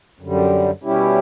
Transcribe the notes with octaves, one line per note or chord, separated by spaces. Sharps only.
F#2 D3 G3
B2 G3 C#4 E4 G4